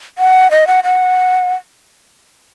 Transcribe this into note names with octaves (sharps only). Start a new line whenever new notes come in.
F#5
D#5
F#5
F#5